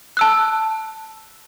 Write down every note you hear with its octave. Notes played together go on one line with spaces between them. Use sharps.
A5 E6 F#6